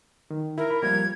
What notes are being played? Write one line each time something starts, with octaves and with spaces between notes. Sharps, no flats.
D#3
E4 A#4
B5
F3 G3 A#3 G#6